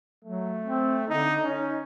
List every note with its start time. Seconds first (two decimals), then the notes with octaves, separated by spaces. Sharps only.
0.25 F#3 A3
0.65 C4
1.08 D3 D#4
1.43 C#4 D#4